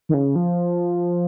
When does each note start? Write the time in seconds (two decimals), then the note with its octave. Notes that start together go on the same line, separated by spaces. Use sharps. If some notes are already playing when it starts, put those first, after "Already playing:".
0.09 D#3
0.14 C#3
0.36 F3